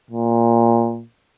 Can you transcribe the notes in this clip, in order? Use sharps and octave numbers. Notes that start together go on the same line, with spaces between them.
A#2